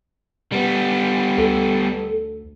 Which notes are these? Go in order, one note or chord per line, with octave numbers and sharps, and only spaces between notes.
G3 B3
D2 A4